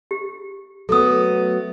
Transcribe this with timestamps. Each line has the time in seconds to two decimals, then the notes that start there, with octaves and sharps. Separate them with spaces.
0.11 G4
0.89 F#3 A3 B3 A4 D#6